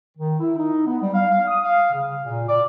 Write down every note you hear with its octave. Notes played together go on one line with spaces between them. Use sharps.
D#3
E4
D#4
B3
G3
F5
F5
D#6
F5
C#3
A#2
D5